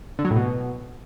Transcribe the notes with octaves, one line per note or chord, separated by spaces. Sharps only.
D3
F#3
A2
B2